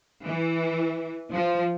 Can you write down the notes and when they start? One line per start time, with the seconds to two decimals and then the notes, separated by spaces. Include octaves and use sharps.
0.23 E3
1.29 F3